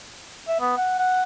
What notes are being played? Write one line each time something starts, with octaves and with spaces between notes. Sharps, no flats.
E5
B3
F#5
F#5